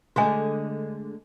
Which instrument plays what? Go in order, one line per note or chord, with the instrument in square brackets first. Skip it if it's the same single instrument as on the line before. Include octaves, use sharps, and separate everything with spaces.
[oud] D3 G#3 A3 [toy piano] F#4 G#5